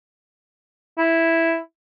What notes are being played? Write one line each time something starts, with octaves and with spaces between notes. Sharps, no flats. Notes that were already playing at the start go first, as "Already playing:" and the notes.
E4